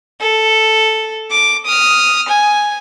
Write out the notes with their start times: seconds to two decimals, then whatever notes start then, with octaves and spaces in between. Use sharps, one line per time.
0.21 A4
1.31 D6
1.66 D#6 F6
2.28 G#5